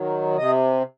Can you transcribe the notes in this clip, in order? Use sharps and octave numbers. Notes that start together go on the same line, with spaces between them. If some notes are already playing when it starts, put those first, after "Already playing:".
Already playing: D#3 F#3
C3 D#5